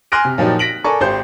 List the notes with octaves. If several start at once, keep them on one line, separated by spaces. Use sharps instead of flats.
G#5 C6 F6 F#6 A#6 D7
C3
A#2 F3 F#3 D#4 G4
A#6 B6 D7 F#7
A4 A#4 D5 G#5 C#6
G#1 G4 C5 G6